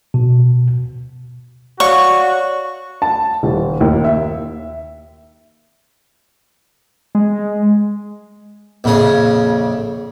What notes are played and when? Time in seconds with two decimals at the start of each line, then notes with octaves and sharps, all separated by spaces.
0.14 B2
1.80 F#4 C#5 D5 F5 C#6
3.02 A5
3.43 D#1
3.81 D#2
4.04 E5
7.15 G#3
8.84 A#1 F2 C#3 G#4